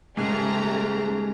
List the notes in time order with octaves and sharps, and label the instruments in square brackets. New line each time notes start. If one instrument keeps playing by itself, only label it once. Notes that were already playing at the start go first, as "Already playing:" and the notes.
[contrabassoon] D#1 [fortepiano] G#2 C#3 [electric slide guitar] G#3 G#4 [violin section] A3 G4 A#5